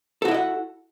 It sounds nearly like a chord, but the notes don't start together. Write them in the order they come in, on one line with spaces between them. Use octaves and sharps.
A4 F#4 E4 D#5 F#5